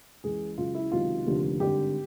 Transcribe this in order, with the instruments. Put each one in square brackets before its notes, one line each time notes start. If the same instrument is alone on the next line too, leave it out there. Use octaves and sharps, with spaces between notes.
[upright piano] C#2 C#3 E3 G#4
C#2 C#3 F#3 F4
E4
C#2 C3 D#3 F#3 F4
F1 D#2 D3 F3
G#1 G2 D3 G4